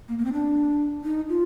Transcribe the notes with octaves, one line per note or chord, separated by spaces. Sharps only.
A#3
A#3
C4
D4
D#4
F4